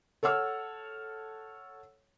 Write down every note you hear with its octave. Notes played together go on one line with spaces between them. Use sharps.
A4 C#5 F#5 E6 F6